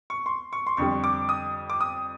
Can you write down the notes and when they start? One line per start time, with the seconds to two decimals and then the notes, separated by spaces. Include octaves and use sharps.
0.10 C#6
0.26 C6
0.53 C#6
0.67 C6
0.77 F2 D3 G3 C#6
1.04 D6
1.29 D#6
1.70 D6
1.81 D#6